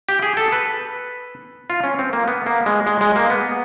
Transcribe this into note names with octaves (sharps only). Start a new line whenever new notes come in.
G4
G#4
A4
B4
F4
C#4
C4
A#3
B3
A#3
G#3
G#3
G#3
A#3
B3